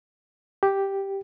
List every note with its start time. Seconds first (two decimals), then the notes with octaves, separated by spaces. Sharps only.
0.63 G4